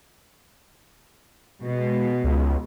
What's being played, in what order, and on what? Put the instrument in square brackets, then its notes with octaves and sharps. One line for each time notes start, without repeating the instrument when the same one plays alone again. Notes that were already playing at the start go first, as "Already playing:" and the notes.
[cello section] B2 G#3
[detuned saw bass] C#2